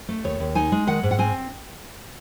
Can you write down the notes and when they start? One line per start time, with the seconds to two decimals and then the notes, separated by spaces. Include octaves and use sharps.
0.09 A3
0.24 D#2 C#5
0.40 D#2
0.55 D#4 G#5
0.72 G#3
0.87 D#3 F#5
1.03 G#2
1.11 F#5
1.19 C4 G#5